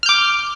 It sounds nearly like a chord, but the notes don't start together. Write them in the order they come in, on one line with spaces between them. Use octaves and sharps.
F6 G6 D6